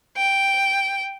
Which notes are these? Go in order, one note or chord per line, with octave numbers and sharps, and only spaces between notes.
G5